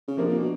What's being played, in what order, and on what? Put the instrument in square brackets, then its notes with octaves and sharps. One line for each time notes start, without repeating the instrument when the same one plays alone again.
[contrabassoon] C#3
[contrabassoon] C3 [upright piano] F3 A#3 D4
[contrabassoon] A#2
B2